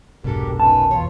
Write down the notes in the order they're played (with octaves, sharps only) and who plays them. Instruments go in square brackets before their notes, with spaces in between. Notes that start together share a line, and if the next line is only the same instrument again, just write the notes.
[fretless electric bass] F1 B1 B2 [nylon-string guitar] G#2 D4 A4 [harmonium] G4 A#4
[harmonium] D#3 C#4 B4 [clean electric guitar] A5
[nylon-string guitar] E2 C#5 [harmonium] F4